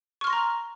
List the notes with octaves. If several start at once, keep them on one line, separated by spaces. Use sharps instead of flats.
A#5 C6 C#6 F6 A#6